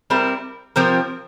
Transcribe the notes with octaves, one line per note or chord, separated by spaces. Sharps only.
G3 C4 E4 A#4
F3 C4 G4 A#4